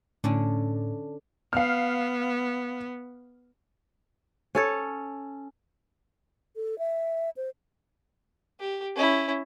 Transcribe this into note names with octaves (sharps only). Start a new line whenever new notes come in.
A2 D3 C#4 D4
B3 F5 F6
C#4 A4 C#5
A4
E5
C5
G4
C#4 E4